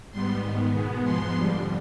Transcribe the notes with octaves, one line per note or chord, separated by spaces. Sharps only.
G#2 G3 B3 C6
G#2 D#3 B3
B2 G#3 B3
G#2 F3 G#3 B3 C6
F2 D3 G3